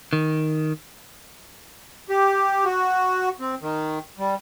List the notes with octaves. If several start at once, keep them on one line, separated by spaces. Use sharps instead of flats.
D#3
G4
F#4
C4
D#3
G3